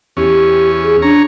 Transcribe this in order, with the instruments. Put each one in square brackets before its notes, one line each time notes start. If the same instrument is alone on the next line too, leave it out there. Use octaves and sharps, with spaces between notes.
[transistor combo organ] E2 C#4 [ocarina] G4
[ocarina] G#4
[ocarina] D4 [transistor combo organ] C#5 A#5